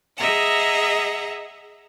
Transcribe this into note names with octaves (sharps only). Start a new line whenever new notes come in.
G#4 D#5 E5 F#5 A#5